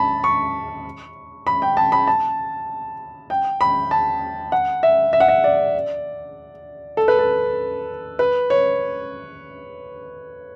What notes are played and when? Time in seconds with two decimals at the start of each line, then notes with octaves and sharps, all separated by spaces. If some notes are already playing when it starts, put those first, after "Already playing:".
Already playing: A5 B5
0.24 C#6
1.47 B5
1.62 G5
1.77 A5
1.92 B5
2.07 A5
3.30 G5
3.61 B5
3.91 A5
4.52 F#5
4.83 E5
5.13 E5
5.20 F#5
5.28 E5
5.44 D5
6.97 A4
7.08 B4
7.19 A4
8.19 B4
8.50 C#5